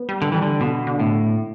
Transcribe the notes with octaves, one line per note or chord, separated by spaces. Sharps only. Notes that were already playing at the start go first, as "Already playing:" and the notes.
Already playing: B3
G3
D3
E3 G3
D3
B2 D3
D3
A2